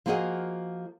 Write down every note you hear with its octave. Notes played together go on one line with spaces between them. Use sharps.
F3 A#3 F4 F#4 G#4 D#5